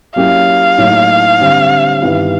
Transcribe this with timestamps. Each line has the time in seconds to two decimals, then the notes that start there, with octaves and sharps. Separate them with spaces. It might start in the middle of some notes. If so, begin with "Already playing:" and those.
0.16 F#3 A#3 C#4 E4 G4 F5
0.78 A2 F#3 A#3 D#4
1.40 D3 G3 C4
2.02 G2 D#3 G3 B3 E4